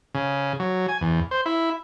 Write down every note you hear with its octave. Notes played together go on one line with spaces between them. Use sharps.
C#3
F#3
G#5
E2
C5
E4